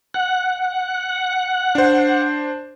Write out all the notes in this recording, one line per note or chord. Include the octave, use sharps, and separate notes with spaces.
F#5
D4 C5